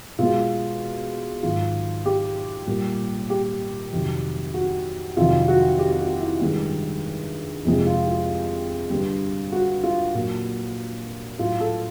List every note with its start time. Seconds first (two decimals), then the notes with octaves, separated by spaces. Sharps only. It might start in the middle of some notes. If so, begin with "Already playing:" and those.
0.19 B2 G#3 F4
1.43 G#2 D#3 F#3 F4
2.06 G4
2.67 A#2 G3
3.30 G4
3.93 F2 C3 D#3 F#3
4.54 F#4
5.16 F2 C3 D#3 F#3 F4
5.48 F#4
5.79 G4
5.99 F#4
6.20 E4
6.41 G2 D#3 G#3
7.65 F2 C3 F3 G#3
7.86 F4
8.07 F4
8.90 G2 D3 G3
9.52 F#4
9.84 F4
10.14 A#2 F#3
11.39 A2 F#3 F4
11.60 A4